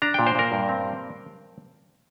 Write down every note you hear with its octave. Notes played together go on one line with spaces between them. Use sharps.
D4 A#5
A#2 G5
C5
A#2 A#4
G2
C4
G3